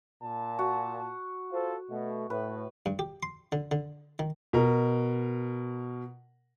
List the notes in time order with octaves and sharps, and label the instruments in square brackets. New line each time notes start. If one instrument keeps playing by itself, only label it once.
[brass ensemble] A#2 A5
[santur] F#4
[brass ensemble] F4 A4 C5
B2 A3
[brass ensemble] A2 [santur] B4
[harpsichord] G2
G4
C6
D3
D3
D#3
[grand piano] B2 A#4